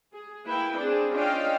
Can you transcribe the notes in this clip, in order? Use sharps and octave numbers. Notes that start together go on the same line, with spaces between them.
G#4
A#3 E4 B4 G5
C4 D4 G#4
C#4 D4 F4 D#5 F5 G5